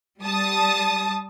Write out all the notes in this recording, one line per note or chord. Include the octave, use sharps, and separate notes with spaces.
G3 A5 D#6